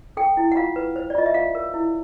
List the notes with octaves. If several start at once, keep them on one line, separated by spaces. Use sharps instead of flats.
A4 G5
E4
F#5
F4 F5
B4
C5
D5
F4 D#5
E5
F4 F5
A#4
E4